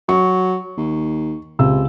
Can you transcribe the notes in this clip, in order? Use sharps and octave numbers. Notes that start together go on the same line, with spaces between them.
F#3 C#6
D#2
C#2 C3 E6